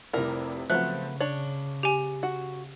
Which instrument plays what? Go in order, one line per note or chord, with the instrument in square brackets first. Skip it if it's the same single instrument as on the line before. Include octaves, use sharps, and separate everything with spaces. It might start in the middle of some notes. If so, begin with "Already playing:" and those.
[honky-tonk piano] F1 C3 E4 [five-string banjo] G3 A#4
[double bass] C#3 [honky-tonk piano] F3 F#3 C4 [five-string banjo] A3 B3 [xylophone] F#6
[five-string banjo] D4 C#5 [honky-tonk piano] F#7
[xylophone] G4 G#5
[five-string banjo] F#4